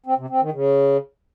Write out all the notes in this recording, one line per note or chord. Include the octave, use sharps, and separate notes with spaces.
C4
C3
C4
D#3
C#3